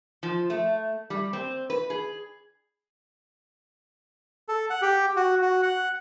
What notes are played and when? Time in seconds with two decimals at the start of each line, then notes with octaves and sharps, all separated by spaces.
0.23 F3
0.50 A3
1.10 G3
1.33 C4
1.70 B4
1.90 G#4
4.48 A4
4.70 F#5
4.82 G4
5.16 F#4
5.42 F#4
5.63 F#5